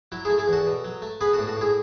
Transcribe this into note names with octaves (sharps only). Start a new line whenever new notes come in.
F#3 E4
A3 E4 G#4
E4 G#4
E2
F#4 A4
B2
F#3
A3
B3 G#4 B4
F#4 A4
A2
F#4 A4
A2 E4 G#4